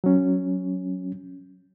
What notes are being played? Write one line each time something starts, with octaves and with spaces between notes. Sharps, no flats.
F#3 C#4